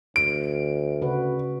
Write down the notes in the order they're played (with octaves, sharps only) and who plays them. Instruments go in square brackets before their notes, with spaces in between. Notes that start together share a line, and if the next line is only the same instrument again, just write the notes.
[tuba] D2 [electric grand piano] D7
[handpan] C#3 F#4 B4